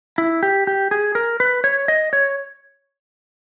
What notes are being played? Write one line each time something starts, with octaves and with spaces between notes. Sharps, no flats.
E4
G4
G4
G#4
A#4
B4
C#5
D#5
C#5